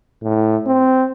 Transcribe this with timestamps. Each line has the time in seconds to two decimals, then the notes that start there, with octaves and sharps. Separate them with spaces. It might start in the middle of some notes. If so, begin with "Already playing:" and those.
0.23 A2
0.67 C4